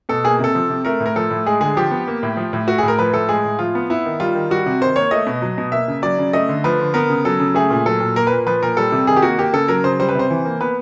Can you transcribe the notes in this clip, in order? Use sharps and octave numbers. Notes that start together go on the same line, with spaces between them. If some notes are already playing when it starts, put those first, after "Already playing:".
B2 A4
A#3 G#4
C3 A4
F3
C3
A3 A#4
A2
A#4
F3 A4
A2
G#3 G#4
D3 G#4
F3 G4
B3
A#3
A2
F3
A2
A3 F#4
G#4
A2
A#4
F3 B4
A2 A4
G#3 G#4
A2
F3 F4
B3
B3 E4
D#3
G3 F4
D#3
G3 F#4
C3
D#3 C5
A#3 C#5
A3 D#5
B2
F#3
B2
A#3 E5
C#3
F#3 D5
C#3
A3 D#5
D3
F3 B4
D3
B3 A#4
C#3
F#3 A4
C#3
A3 G#4
A#2
F#3 A4
A#2
A#3 A#4
B4
A#2
F3 B4
A#2 A#4
G3 A4
C3
D#3 G#4
G4
A#3 F#4
A#3 G4
C#3 A4
F#3 A#4
C#3 C5
G3 C5
B4
C3 C5
E3
A#3
B3 B4